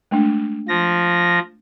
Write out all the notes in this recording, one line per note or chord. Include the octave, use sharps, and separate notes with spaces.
G#3 A3 D4
F3 A#6